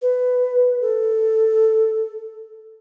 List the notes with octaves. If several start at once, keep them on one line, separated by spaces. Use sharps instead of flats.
B4
A4